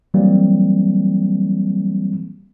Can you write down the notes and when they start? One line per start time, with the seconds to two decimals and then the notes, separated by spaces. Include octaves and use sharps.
0.14 E3 F#3 G3 A#3 C4